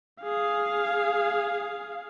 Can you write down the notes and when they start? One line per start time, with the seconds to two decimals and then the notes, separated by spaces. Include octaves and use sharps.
0.23 G#4 F5